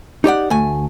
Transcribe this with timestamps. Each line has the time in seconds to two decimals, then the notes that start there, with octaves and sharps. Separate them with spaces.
0.24 D#4 G4 D5 F#5
0.50 D2 A3 G#5